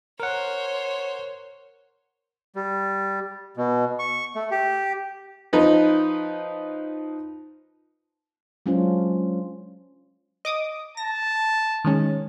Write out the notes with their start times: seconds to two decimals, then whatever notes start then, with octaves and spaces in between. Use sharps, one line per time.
0.20 A#4 C5 C#5 F#5
2.56 G3
3.57 B2
3.99 C#6
4.35 A3
4.51 G4
5.53 F3 D#4 B4
8.66 F#3 G#3 C#4 D4 F4 C5
10.45 D#5 D6 D#6
10.97 A5 A#6
11.85 D#3 G#3 C#4